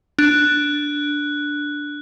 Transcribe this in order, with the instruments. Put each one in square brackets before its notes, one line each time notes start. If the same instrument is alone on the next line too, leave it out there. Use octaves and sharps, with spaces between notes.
[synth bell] D4 [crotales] F#6